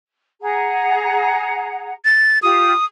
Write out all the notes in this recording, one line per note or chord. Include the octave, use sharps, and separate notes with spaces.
G#4 F#5 A#5
A6
F4 G4 D#6